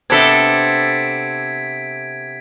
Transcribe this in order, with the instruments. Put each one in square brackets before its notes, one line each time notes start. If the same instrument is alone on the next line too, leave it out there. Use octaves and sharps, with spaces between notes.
[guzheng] C3 B3 D4 [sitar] C4 A4 [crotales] G#6 B6 D7